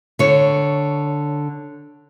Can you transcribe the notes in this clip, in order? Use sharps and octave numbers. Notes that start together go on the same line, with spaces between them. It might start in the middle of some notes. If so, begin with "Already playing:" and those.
D3 C#5